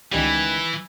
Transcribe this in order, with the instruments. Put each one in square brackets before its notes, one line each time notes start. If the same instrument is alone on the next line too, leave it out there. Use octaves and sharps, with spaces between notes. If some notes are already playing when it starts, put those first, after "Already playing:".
[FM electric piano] C#2 D#3 G3 [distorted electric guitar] E3 [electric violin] G#5 B5